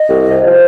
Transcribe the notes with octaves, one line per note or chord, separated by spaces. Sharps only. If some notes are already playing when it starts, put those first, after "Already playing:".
Already playing: D#5
C2
C3
F3 C5